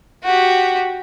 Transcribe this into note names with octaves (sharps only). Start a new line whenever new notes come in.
F#4 G4